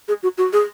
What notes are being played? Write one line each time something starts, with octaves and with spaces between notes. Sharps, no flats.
G#4
F#4
F#4
G#4